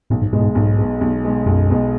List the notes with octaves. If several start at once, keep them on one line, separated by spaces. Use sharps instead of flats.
B1 A2
G#2
G#2 B2 G#3
A2
G#2
B1 G#2
B2 G#3
B1
B2 G#3
B1 F#2
B2 G#3